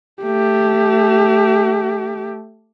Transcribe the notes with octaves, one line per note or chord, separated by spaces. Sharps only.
A3 G4